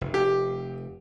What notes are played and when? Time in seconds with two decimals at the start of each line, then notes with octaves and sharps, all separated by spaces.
0.01 F1
0.14 G4